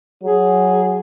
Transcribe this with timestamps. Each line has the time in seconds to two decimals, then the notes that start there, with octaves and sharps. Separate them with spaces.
0.24 F#3 G#4